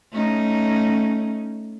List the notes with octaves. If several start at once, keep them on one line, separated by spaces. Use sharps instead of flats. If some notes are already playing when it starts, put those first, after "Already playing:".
A3 C#4 D#4